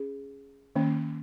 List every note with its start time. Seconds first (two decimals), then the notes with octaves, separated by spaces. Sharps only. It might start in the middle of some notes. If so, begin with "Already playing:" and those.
Already playing: C#4 G#4
0.76 D#3 A#3 C#4